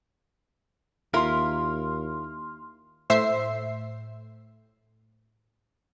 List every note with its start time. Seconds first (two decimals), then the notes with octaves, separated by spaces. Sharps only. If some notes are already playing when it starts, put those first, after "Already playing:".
1.14 D#2 E4 F4 A#4 C6 F6
3.10 A2 C5 E5 C7